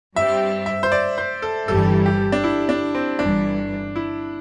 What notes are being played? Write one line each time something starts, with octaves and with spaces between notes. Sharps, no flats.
G2 G3 C4 G4 E5
E5
C5
D5
C5
A4
G1 G2 E3 G3 A4
G4
D4
E4
D4
C4
G1 G2 E3 D4
E4